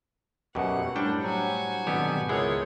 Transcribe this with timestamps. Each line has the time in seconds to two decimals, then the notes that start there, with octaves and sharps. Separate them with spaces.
0.55 F#2 B2 F#4 G4 F#5
0.96 A2 G3 D4 C5 G5
1.24 F#3 F#4 G#5
1.87 G#1 B2 D3 B3 G4
2.29 C#2 G#3 B3 E4 G#4 A#4 C#5 G6